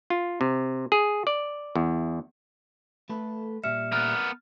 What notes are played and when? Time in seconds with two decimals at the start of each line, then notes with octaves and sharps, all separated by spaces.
0.10 F4
0.41 C3
0.92 G#4
1.27 D5
1.76 E2
3.09 A3 A4 B4
3.64 A#2 G3 E5 F6 C#7 E7
3.92 B3 A#4 F6 F#6 A6